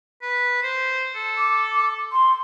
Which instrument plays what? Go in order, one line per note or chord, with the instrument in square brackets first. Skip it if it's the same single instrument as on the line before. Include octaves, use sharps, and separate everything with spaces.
[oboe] B4
C5
A4
[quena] D6
C6